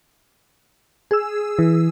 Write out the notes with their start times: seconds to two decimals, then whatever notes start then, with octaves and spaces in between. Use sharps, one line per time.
1.11 G#4 E6
1.59 E3